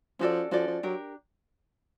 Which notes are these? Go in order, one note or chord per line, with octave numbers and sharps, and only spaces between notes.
F3 C#4 F#4 A4 D5
F3 C#4 F#4 A4 D5
F3
F#3 D4 G4 A#4